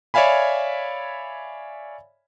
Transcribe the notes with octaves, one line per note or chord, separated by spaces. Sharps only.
C#5 D5 E5 F5 G#5 B5